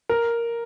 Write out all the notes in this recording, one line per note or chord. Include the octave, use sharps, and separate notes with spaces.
A#4